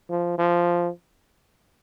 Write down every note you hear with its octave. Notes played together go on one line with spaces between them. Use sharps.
F3
F3